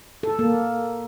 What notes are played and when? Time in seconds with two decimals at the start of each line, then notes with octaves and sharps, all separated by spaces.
0.23 A4
0.39 A#3